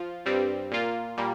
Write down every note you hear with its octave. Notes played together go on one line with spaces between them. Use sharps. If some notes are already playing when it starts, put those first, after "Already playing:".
Already playing: F3 F4
G2 G3 C4
A#2 A#3 F4
A#2 G3 A#3